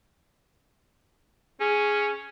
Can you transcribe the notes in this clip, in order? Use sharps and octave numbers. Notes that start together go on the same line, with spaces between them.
C#4 G#4